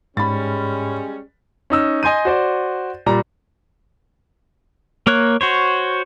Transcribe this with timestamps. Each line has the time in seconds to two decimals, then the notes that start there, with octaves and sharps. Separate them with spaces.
0.17 G#2 G3 G#3 C#4 B5 A6
1.70 C#4 D#4 E6 F6
2.03 D#5 G#5 C6 G6 D#7
2.25 F#4 C5 D5
3.06 A#2 G3 A#5
5.07 A#3 A#4 C#5 F#6
5.41 F#4 C5 C#5